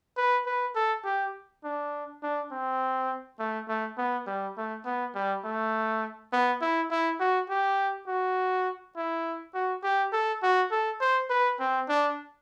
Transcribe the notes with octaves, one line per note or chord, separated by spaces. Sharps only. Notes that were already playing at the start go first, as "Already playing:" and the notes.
B4
B4
A4
G4
D4
D4
C4
A3
A3
B3
G3
A3
B3
G3
A3
B3
E4
E4
F#4
G4
F#4
E4
F#4
G4
A4
F#4
A4
C5
B4
C4
D4